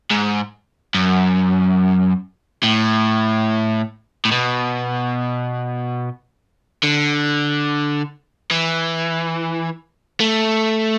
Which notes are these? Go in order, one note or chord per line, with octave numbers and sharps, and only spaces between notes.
G#2
F#2
A2
A2
B2
D3
E3
A3